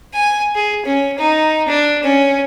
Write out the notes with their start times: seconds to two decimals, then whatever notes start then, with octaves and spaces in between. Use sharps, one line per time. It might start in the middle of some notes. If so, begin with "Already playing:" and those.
0.14 G#5
0.55 G#4
0.85 C#4
1.18 D#4
1.68 D4
2.03 C#4